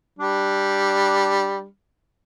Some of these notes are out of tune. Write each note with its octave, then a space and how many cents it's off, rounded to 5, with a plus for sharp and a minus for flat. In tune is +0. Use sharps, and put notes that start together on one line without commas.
G3 +0 D4 +0